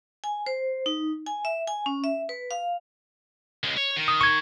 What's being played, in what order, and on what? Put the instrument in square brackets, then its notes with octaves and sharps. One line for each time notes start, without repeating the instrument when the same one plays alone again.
[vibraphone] G#5
C5
D#4
G#5
E5
G#5
C#4
E5
B4
F5
[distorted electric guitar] C#2 G#3
C#5
D#3
[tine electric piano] D#6
C#6 G#6